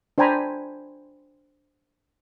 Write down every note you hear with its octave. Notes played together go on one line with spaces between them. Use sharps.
D4 C5 G5 G#5 A#5 B5